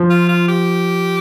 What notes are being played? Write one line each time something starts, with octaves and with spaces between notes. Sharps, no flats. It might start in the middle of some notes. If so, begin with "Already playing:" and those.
Already playing: F3
F4
F4
G4